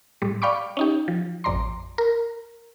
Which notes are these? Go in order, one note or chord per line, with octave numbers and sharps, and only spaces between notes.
A2 G3
D5 F5 G5 B5 C#6 D6
C#4 D#4 G4
F3
A1 F2 D5 A#5 C6
A#4